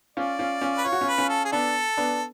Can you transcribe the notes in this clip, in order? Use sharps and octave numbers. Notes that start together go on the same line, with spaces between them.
C#4 F4 D5
C#4 F4
C#4 F4
B4
F4 C#5
F#4
C#4 F4
B4
C#4 F4
A4
G#4
B3 D4 A4
B3 D4